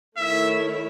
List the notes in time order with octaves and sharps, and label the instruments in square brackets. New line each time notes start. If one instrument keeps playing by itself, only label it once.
[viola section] D#3 A3 E4 A4 C#5 [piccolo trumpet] E5